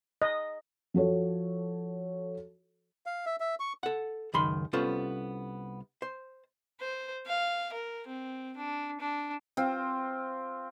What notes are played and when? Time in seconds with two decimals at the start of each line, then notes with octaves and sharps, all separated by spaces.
0.22 D#5
0.94 F3 F#4 A4 C#5
3.06 F5
3.26 E5
3.40 E5
3.60 C#6
3.83 A4 F#5
4.34 C#2 F#2 D#3 B5 C6
4.73 C2 B3 C#4 F4 A4 C5
6.02 C5
6.80 C5
7.26 F5
7.73 A#4
8.07 C4
8.56 D4
9.00 D4
9.57 C4 F4